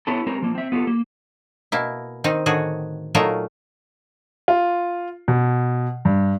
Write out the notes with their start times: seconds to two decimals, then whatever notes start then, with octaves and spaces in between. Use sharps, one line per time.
0.07 B3 C#4 E4 G4 A4
0.27 G#3 C4 C#4 G4 A#4
0.42 F3 A#3
0.55 C4 E5
0.72 B3 F4 G4 A4
0.87 A#3
1.72 B2 A#3 E4
2.24 D#3 C4 D#4
2.46 A2 D3 D#3 F#4 G#4
3.15 A#2 F#3 A3 D#4 F4 A#4
4.48 F4
5.28 B2
6.05 G2